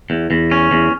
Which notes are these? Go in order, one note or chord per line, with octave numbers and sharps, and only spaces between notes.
E2
E2
C#4
E2